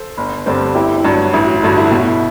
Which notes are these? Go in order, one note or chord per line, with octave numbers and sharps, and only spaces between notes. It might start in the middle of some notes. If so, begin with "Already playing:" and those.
Already playing: A4 C5
G1
G2 D3 G3 C4
G1 E4 G4
E4
G2 F#3 D4 F#4
A1 E4
F#4
E4
G2 D3 F#4
E4
B2 F#4
E4